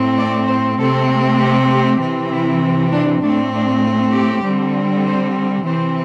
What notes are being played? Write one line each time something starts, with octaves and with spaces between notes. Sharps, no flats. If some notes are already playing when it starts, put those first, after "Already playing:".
Already playing: A2 A3 C4
D5
C5
C3 A3 C4 A4
G4
G4
C3 E3 C4
E4
D4
A2 A3 C4 D4
D4
G4
D3 G3 C4
C5
C3 E3 C4 C5